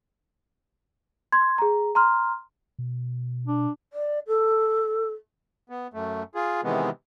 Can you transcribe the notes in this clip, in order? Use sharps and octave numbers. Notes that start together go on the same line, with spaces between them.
C6 G#6
G#4 A#5
A#5 C6 F6
B2
D4
D5
A4
B3
F#2 A3
F4 G#4
C3 D#3 E3 G#3 B3